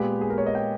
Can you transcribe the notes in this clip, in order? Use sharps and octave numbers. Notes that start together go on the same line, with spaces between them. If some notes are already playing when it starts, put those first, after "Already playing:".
Already playing: A#2 G#3 B3 G4
G#4
A#4
C#5
D#5
G5